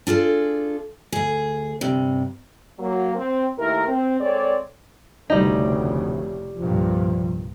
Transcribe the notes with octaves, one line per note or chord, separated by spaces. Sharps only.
D4 F4 G#4 A4
D2 G#4
G2 C3
F#3 A#3
C4
D#2 A3 E4 A#4
C4
G#3 C4 A4 C#5 D5
F1 D2 A2 C#3 G3 D#4
C2 G2 A#2 F3